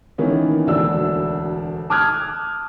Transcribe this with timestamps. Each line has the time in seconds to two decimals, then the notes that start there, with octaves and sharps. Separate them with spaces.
0.18 D#3 E3 A#3 B3 C#4
0.67 E1 D2 D4 F#4 E6
1.90 A5 D6 D#6 F6 F#6 G#6